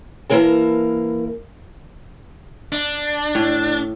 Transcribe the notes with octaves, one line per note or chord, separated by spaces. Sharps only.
E3 A#3 A#4 A5
D4
A2